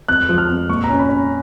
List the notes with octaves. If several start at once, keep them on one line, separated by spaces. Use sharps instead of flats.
F2 F#6
F3
F6
F2
A#2 C#6
A#5
C#4
B5
C#4